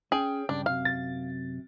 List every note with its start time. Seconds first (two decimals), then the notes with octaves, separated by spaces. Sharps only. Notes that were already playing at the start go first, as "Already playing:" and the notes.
0.12 C#4 G#4 G5
0.49 C#2 G2 C#3 D4
0.66 F#2 C3 F5
0.85 A6